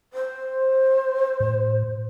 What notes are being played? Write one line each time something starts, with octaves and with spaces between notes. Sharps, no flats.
C5
A2